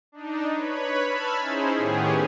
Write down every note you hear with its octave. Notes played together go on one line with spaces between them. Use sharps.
D4 D#4
B4 C#5 B5
A5 B5 E6 F6 G#6 B6
C#4 D#4 E4 G#4 C5
A2 D#3 B3 C#4 G4 G#4